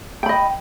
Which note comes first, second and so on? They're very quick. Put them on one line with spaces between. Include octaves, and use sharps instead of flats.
G5 B5 D#5